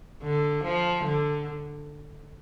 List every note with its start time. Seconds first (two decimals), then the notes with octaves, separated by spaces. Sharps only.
0.23 D3
0.64 F3
1.04 D3